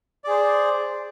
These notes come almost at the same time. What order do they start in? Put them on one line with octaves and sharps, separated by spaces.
D5 G#4 C5